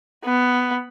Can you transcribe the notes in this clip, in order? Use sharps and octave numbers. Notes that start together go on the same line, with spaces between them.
B3